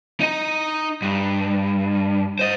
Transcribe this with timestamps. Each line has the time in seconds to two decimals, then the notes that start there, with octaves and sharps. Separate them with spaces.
0.20 D#4 D#5
1.02 G2
2.39 C5 D#5